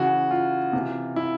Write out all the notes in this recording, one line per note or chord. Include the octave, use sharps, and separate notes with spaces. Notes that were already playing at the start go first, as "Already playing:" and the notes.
Already playing: C#3 E3 F#4
F4
C3 E3
E4